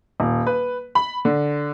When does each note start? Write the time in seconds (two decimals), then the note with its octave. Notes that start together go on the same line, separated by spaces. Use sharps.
0.20 D#1
0.47 B4
0.95 B5
1.25 D3